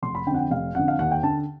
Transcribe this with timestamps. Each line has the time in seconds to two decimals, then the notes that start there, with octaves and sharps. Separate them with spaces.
0.02 F1 C6
0.15 B5
0.26 D3 G5
0.31 F2 F#5
0.39 G5
0.50 F1 F5
0.75 F2 D3 F#5
0.88 F5
0.99 D#2 F#5
1.12 G5
1.23 D3 A5